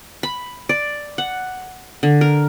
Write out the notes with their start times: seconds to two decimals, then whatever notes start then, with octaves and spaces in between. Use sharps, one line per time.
0.23 B5
0.69 D5
1.18 F#5
2.03 D3
2.21 A#4